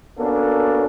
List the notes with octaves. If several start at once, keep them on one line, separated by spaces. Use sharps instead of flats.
A#3 B3 C#4 D4 F#4 A4